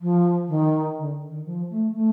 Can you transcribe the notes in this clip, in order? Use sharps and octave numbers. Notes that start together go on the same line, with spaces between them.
F3
D#3
D3
D#3
F3
A3
A3